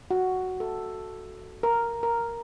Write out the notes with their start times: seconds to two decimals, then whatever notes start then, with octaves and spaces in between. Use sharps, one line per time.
0.11 F#4
0.60 A4
1.63 A#4
2.03 A#4